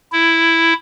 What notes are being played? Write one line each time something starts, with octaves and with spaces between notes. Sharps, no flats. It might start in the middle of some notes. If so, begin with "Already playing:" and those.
E4